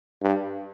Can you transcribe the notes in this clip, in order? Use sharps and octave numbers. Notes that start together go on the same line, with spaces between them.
G2